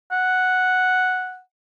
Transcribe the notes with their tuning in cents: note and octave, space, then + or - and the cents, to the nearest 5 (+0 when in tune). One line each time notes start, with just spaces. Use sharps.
F#5 +0